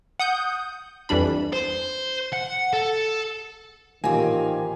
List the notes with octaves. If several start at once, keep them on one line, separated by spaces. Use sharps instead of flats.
F#5 D#6 G6
F2 E3 G3 D4 B5
C5
F#5
A4
A1 A#2 D#3 A#3 C4 G4 G#5